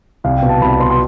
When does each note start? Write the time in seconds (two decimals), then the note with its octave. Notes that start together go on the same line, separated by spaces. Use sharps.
0.24 C2 F5
0.37 G5
0.42 B2
0.49 A5
0.61 C2 B5
0.80 B2 C6
0.90 C6